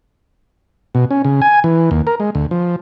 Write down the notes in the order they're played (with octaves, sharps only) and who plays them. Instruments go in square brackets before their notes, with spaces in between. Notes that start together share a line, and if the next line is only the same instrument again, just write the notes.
[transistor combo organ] B2
C#4
C#3
G#5
E3
D#2
A#4
G#3
D2
F3